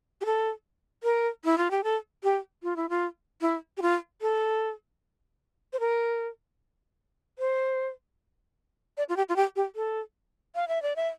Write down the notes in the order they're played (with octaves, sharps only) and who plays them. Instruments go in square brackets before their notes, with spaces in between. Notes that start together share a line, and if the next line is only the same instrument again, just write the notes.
[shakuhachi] G4
A4
A#4
E4
F4
G4
A4
G4
F4
E4
F4
E4
G4
F4
A4
C5
A#4
C5
D5
F4
G4
F4
G4
G4
A4
F5
E5
D5
E5